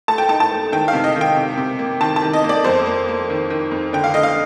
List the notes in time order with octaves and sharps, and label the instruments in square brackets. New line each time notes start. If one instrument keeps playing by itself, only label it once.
[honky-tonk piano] A3 A5
G5
D#4 A5
A5
A3
D#3 G5
F5
C3
D#5
D#3
G5
C3
C3
A#3
D#3 A5
A5
D#3
D#5
A#3
D5
F2 C5
A#3
A#3
D#3
D#3
F2
D3 G5
F5
D3 D#5
F5